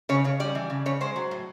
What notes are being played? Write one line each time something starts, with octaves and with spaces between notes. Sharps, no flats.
C#3 C#5
C#3 C#5
G3 D5
E3
C#3
C#3 C#5
G#3 C5
F#3
A2